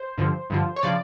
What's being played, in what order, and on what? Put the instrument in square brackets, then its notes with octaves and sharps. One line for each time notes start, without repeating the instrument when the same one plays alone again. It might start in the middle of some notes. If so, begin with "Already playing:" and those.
Already playing: [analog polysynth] C5
G2 D3 F3
G2 D3 F3
C#5
C#3 F3 D5